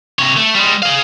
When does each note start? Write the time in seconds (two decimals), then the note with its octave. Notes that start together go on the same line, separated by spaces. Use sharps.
0.19 C3 C#5
0.37 A3
0.54 G3 G#3
0.82 G#4 F5